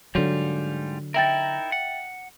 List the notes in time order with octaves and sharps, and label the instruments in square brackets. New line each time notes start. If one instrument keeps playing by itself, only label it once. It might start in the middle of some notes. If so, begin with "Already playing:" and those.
[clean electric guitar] G#2 G3 F4 [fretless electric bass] D3 F#3
[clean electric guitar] D#4 E4 A#4 [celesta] E5 G5 A6
[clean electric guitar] F#5